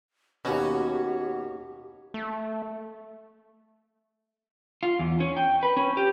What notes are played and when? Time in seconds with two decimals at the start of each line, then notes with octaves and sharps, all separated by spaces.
0.45 D#2 B2 C#4 F#4 G4
2.14 A3
4.83 F4
4.99 E2
5.20 C#4
5.37 G5
5.63 B4
5.77 C#4
5.97 G4